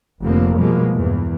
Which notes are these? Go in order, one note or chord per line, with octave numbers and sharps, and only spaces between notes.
F1 F2 D3 A#3 C4
B2 F3 G3 G#3 A#3
E2 G2